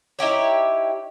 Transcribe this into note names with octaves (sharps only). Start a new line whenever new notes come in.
D#4 E4 G4 C#5